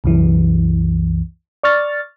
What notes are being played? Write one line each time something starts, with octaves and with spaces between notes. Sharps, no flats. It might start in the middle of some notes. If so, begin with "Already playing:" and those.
C2 F#2 E3
D5 C#6 F6 A6